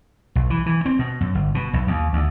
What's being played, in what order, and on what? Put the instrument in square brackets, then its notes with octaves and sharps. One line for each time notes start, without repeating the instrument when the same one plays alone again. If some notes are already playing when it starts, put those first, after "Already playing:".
[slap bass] B1
E3
E3
C4
B2
F#2
G1
B2
B1
D#2
D2